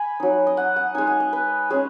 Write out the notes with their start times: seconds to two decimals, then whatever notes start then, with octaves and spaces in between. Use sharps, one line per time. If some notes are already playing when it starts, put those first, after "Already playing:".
Already playing: G#5 B5
0.20 F#3 D#4
0.47 D#5
0.57 F#5
0.76 F#5
0.94 G#3 D#4 G#5
1.07 G#5
1.20 D#5
1.33 B4
1.70 G#3 C#4 G#4